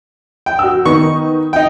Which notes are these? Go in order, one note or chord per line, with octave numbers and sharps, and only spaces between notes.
G5
F#4 E6
D#3 B3 D#4 C#6
D#4 G5